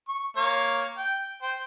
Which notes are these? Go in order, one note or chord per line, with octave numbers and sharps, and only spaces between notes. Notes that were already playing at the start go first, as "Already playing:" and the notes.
C#6
A#3 C#5 F5
G5
C5 G5